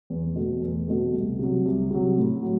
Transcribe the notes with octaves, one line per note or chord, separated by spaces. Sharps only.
E2
B2 A3
E2
B2 A3
C2
C3 F#3
C2
C3 F#3
A2
F#3